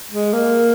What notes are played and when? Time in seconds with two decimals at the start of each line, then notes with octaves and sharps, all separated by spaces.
0.11 G#3
0.33 A#3